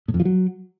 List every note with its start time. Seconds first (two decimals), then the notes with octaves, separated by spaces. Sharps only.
0.08 A2
0.14 F2
0.20 F3
0.25 F#3